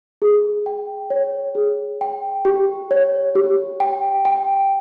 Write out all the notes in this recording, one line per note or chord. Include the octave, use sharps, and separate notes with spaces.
G#4
G5
C#5
G#4
G5
G4
C#5
G4
G5
G5